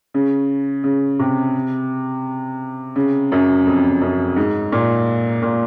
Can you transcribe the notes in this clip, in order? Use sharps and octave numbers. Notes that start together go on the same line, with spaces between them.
C#3
C#3
C3
C#3
F#2
F2
F#2
G#2
A#2
A#2